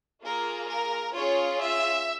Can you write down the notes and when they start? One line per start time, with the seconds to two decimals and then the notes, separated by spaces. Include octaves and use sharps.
0.23 A#3 F4 G#4 A#4
0.69 A#4
1.15 C#4 F4 G#4 C#5
1.62 E5